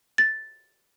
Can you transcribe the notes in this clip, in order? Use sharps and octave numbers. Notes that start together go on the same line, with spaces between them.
A6